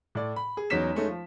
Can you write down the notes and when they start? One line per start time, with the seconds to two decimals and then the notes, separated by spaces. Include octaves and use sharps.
0.15 A2 D5
0.36 B5
0.57 G#4
0.70 E2 F#3 C#4 D#4 B6 E7
0.95 G#3 A3 C#4 D#4
1.08 F3